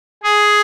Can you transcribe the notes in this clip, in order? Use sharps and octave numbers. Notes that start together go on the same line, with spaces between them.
G#4